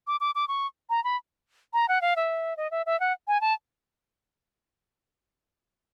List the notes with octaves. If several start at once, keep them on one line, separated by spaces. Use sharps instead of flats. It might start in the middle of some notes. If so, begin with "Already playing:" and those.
D6
D6
D6
C#6
A#5
B5
A#5
F#5
F5
E5
D#5
E5
E5
F#5
G#5
A5